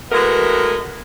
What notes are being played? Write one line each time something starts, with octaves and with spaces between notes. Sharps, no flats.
E3 G#3 A3 B3 F#4 A#4